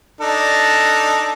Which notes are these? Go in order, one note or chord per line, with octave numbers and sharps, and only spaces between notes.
D4 D#4 A4